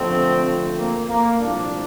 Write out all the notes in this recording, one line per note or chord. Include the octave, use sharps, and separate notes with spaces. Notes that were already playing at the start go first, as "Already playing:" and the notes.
Already playing: F2 D3 F3 A3 C4
A#3
A#3
C2 A#2 F3 A3 D4